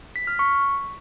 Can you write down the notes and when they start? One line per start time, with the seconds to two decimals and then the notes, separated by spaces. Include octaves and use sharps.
0.16 B6
0.27 F6
0.39 C#6